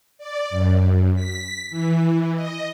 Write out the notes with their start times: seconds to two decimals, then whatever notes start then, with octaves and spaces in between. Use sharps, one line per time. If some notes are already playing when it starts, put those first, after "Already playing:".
0.18 D5
0.50 F#2
1.15 B6
1.70 E3
2.35 D#5